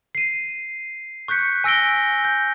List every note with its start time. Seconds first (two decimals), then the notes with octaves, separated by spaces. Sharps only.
0.15 C7 D#7
1.28 C#6 F#6 G6 B6 C#7
1.64 G#5 E6 A#6 D7 G7
2.25 G6